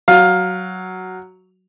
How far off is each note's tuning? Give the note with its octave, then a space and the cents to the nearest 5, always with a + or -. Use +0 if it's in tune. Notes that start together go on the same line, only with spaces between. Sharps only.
F#3 +5 F5 +15